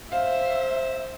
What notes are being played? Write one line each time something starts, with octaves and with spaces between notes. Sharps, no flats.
C5 E5 F5